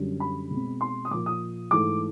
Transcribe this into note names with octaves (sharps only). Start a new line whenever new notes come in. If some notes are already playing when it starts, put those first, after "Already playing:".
Already playing: F#2 D3 G3
B5
B2 G#3 C4
C6
D#6
A#2 F3 A#3 D6
D#6
G#2 E3 A3 D6